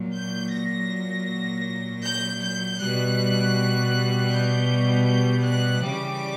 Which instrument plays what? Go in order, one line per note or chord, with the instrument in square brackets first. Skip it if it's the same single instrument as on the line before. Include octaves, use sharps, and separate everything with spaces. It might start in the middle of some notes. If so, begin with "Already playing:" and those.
Already playing: [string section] A#2 F#3
G6
A#6
G6
G6
B2 G3 F#6
G6
G6
F#6
C#3 E3 G3 D6